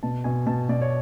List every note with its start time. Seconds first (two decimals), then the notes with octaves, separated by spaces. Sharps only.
0.03 B2 A5
0.24 B2 G#5
0.47 B2 A5
0.69 B2 D5
0.82 C#5